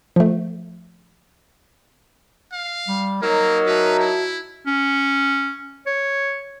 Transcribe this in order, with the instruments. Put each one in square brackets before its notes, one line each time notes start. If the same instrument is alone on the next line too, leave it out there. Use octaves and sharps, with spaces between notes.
[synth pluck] F3 A3
[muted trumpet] F5
[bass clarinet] G3
[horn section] F#3 D#4 [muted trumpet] A#3 [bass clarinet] A#4
[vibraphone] F#4 E5 A5 [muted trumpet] B4
[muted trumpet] E4
[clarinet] C#4
C#5